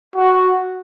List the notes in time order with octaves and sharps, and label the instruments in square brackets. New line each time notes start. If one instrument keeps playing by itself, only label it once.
[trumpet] F#4